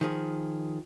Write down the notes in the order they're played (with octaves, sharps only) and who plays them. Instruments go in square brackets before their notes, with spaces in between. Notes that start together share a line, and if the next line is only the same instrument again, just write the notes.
[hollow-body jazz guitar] D#3 F3 G#4